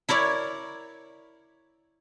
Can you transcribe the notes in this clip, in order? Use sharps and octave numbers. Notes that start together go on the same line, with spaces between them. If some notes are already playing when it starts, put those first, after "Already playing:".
E4 A#4 C#5 D5